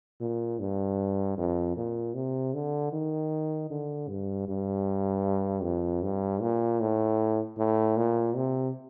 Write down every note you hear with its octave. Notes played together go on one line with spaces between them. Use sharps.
A#2
G2
F2
A#2
C3
D3
D#3
D3
G2
G2
F2
G2
A#2
A2
A2
A#2
C3